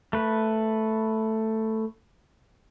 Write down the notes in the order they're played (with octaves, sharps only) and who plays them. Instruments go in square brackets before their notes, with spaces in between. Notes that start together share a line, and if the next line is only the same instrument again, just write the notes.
[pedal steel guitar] A3 B4